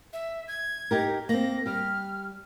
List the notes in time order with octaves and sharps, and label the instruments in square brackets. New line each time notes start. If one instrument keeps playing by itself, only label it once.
[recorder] E5
G#6
[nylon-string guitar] D#4 G4 A#4
[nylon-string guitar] A#3 C4 [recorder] A#6
[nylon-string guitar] G3 G4 [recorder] F6